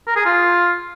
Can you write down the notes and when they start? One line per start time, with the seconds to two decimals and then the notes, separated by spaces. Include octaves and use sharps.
0.07 A#4
0.16 G#4
0.25 F4